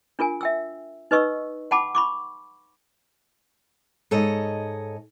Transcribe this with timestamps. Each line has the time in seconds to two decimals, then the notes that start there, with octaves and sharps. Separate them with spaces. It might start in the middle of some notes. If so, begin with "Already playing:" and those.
0.19 D4 F4 A#4 G#5
0.41 E5 G5 E6
1.11 D#4 B4 D#5 C#6 E6
1.71 F#5 G5 A5 B5 D6
1.95 B5 C#6 D6
4.11 G#2 A4 C#5 D#5